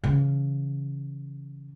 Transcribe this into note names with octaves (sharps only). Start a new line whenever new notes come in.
C#3 E3